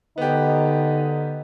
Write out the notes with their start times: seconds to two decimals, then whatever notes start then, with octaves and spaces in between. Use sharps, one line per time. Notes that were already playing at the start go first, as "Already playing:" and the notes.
0.18 D3 B3 D#4 G4